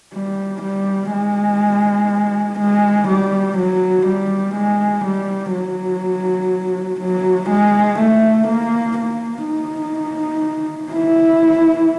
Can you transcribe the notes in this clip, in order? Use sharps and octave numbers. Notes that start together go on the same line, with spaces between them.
G3
G3
G#3
G#3
G3
F#3
G3
G#3
G3
F#3
F#3
G#3
A3
A#3
A#3
D#4
E4